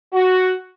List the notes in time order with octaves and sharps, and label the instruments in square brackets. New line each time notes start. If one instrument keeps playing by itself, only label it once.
[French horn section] F#4